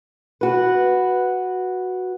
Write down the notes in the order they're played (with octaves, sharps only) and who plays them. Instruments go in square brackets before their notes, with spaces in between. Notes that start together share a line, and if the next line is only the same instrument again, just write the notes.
[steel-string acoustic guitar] F#4 B4